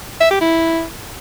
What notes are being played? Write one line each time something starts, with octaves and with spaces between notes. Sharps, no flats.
E5
G4
E4